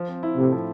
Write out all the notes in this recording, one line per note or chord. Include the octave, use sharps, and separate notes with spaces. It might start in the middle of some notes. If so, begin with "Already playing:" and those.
Already playing: F3
C4
E4
A2 C3
F3